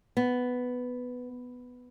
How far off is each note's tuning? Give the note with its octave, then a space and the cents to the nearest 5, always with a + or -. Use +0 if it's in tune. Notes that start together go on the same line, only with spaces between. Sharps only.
B3 +5